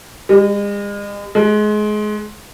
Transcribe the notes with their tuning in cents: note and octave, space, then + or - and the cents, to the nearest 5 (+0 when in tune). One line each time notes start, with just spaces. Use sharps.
G#3 -40
G#3 +25